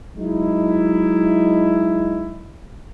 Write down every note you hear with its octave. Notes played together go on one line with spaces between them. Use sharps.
F#3 G#3 D#4 E4